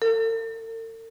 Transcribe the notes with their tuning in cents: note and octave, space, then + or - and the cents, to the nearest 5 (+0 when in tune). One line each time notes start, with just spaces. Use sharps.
A4 +45